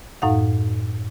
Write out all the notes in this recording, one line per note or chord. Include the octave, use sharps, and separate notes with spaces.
F#2 A2 D#4 F5 F#5